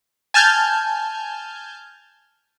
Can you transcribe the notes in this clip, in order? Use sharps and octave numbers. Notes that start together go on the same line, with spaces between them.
G#5 A5 F6 G6 G#6